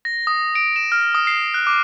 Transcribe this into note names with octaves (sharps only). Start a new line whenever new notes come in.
A#6
D#6
D7
E7
F6
D#6
C7
F#6
D6